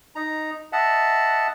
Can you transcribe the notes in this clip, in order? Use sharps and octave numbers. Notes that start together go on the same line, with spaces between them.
D#4 A#5
D#5 E5 F#5 A5